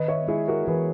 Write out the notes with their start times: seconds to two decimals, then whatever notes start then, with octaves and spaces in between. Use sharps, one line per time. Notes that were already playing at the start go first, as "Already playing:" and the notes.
Already playing: D#3 B4 D#5
0.08 C#5 E5
0.28 G#3 E4 G#4
0.48 F#4 A#4
0.67 E3 G#4 B4